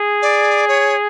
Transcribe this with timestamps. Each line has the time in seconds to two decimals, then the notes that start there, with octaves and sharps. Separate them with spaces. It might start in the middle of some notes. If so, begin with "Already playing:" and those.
Already playing: G#4
0.22 D5
0.68 C#5